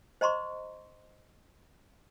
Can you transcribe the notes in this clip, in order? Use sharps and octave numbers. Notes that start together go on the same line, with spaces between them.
C5 D#5 A#5 C6 C#6